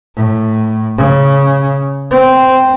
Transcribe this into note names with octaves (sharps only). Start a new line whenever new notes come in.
A2
C#3
C4